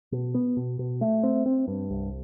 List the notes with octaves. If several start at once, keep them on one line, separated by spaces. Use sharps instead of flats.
B2
B3
B2
B2
A3
C4
C4
G2
C2